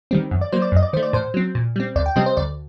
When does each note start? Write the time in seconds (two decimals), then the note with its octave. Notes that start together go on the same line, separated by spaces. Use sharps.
0.11 D#3 G3 C4
0.31 F#2
0.41 D5
0.52 F#3 A#3 C5
0.62 D5
0.72 F#2 D#5
0.83 D5
0.93 D#3 C5
0.97 A3
1.03 D5
1.13 A2 C5
1.34 F#3 C4
1.55 A#2
1.76 G3 C4
1.95 D2 D5
2.06 G5
2.16 C3 G3 C4 D#5
2.26 C5
2.37 D2 D5